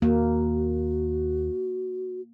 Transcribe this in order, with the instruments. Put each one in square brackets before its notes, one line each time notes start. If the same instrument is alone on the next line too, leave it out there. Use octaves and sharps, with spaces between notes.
[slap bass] D#2 [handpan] A#3 [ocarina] F#4